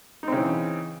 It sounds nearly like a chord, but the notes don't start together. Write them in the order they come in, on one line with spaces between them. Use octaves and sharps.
D#4 C4 C#3 E3